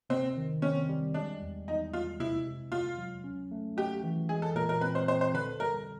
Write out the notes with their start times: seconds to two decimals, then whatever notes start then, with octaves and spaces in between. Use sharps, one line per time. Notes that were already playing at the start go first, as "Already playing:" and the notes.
0.10 C3 C4
0.37 D#3
0.62 C4 C#4
0.89 G3
1.14 G#3 D4
1.41 E2
1.67 E2 D#4
1.93 G#3 F4
2.19 C3 E4
2.46 C3
2.72 C3 F4
2.98 F#3
3.24 C#4
3.51 A3
3.77 F#4 G4
4.03 E3
4.29 G#3 G#4
4.42 A4
4.55 A#2 A#4
4.69 A#4
4.81 C4 B4
4.95 C5
5.08 C4 C5
5.21 C5
5.34 D3 B4
5.60 G3 A#4